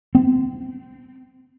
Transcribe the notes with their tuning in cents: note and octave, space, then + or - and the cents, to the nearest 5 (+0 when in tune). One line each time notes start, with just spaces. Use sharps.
C4 -20